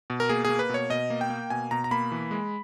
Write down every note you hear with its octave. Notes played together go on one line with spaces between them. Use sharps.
B2
A#4
A#3 G#4
A#3 G#4
B4
B2 C#5
B2 D#5
A#3
G5
A#3
B2 G#5
B2 A#5
A#5
A#3 B5
E3
G#3